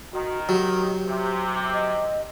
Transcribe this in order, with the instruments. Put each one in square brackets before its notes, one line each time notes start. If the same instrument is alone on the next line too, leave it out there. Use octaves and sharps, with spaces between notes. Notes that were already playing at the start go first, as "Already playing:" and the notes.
[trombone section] D#3 [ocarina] F#4
[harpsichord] F#3 [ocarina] G4
[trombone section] C3
[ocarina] D#5